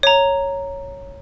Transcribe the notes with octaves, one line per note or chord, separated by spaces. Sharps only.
C#5 A#5